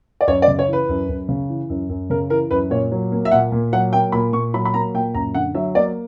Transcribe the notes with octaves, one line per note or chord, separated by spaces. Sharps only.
D5
F#2 C#5
D5
C#3
C#5
E3
B4
F#2
F#2
C#3
E3
F#2
F#2
C#3 A#4
E3 A#4
F#2 B4
A#2 C#5
F#3
A#3
E5
A#2 F#5
A#2
F#3 F#5
A#3 G5
A#2 B5
A#2 C#6
F#3 B5
B5
A#3 A#5
A#2 G5
F#2 A#5
D3 F#5
F#3 E5
A#3 D5